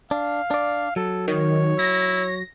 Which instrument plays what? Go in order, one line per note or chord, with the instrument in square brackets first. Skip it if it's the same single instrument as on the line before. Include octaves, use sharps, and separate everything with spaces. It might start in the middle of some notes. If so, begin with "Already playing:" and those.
[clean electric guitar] D4 [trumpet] F5
[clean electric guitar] D4 D5
[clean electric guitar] F#3 [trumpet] A4
[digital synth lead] D#3 [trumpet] C#5
[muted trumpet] E4 [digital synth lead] A#6